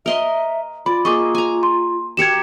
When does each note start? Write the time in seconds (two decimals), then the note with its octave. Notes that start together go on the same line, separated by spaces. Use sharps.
0.06 A#4 D#5 E5 C6
0.86 F4 D5 B5
1.05 A#3 G#4 D#5 C#6 D6
1.35 G#5 A#5
1.63 C6
2.17 F#4 G4 A#4 G#6 C#7 E7